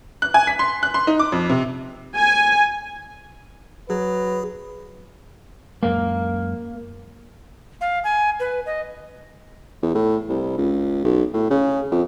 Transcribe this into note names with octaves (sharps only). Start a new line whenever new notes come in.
F#6
G#5
B6
C6
F#6
C6
D#4
D6
F2
C3
G#5
F#3 G#4 B4
F#2 G#3 A#3
F5
G#5
B4
D#5
E2
A2
C2
C#2
B1
A2
C#3
F2